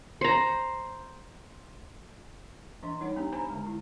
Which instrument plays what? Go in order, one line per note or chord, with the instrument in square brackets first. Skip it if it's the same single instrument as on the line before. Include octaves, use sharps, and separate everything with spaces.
[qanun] C5 A#5
[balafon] E3 D4 D#5 C6
G3 D#4 C#5 F#5
B3 D4 G4
C5 G#5 A#5 B5
D3 G#3
E4